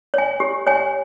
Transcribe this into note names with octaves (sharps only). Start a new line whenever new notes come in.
C#5 G#5
G4
C#5 G#5